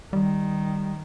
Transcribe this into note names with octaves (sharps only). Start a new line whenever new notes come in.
D#3 G3